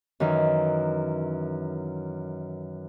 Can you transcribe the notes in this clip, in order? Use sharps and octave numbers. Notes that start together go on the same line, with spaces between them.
F#2 D#3 E3